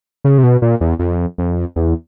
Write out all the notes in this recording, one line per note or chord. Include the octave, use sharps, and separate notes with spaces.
C#3
C3
B2
A#2
E2
F2
F2
E2